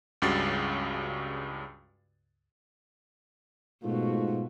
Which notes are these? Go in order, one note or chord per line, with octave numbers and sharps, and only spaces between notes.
C#2 G2 C#3 F#4 A6 C7
G#2 B2 A3 F4 F#4